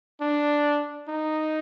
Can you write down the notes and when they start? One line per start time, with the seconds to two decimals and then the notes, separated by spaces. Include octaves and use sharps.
0.21 D4
1.08 D#4